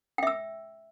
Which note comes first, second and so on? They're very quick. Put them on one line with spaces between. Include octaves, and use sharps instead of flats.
G5 E5 E6